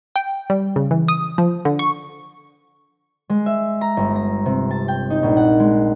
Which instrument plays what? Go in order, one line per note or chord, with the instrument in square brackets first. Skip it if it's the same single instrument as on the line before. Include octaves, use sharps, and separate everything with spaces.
[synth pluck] G5
G3
C#3
E3
D#6
F3
D3
C#6
[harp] G#3
E5
A#5
G1
A#5
C3
A5
G5
D#4
A#1
F#5
G#3